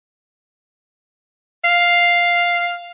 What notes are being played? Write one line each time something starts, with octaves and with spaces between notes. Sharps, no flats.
F5